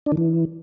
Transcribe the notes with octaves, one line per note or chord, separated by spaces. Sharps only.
D4
D#3
E3